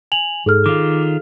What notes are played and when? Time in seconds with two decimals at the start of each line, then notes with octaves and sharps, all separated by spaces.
0.12 G#5 F7 F#7
0.46 G#2 G#4 A4 F6
0.66 D#3 F4 D6